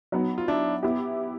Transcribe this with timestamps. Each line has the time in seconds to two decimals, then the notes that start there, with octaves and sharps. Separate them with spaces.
0.12 F#3 B3 D#4
0.38 F4
0.48 D4 E4
0.83 B3 E4 G4